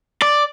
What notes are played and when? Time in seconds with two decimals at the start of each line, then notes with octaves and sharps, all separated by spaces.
0.22 D5